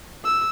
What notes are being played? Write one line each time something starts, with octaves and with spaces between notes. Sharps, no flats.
E6